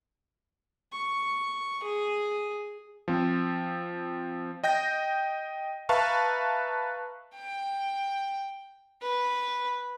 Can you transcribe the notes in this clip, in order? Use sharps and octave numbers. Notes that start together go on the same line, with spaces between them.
C#6
G#4
F3 C4
D#5 G5 G6 A#6
B4 E5 F5 A5 A#5 C#6
G5
B4